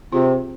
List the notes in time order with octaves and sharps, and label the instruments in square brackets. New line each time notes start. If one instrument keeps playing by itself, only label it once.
[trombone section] C3 [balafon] C4 F4 G#4